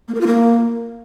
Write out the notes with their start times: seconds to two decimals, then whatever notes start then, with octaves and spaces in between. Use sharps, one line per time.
0.08 A#3
0.14 A#4
0.21 F4
0.27 A#3